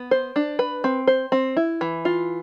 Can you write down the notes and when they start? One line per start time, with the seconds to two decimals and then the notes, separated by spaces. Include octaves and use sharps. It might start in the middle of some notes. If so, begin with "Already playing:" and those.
Already playing: B3
0.11 C5
0.36 D4
0.59 B4
0.84 C4
1.07 C5
1.32 C4
1.57 E4
1.81 E3
2.05 F4